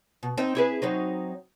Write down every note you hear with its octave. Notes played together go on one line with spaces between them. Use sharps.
B2
C4 D#4 C5
E4 G#4 B4
F#3 C4 D#4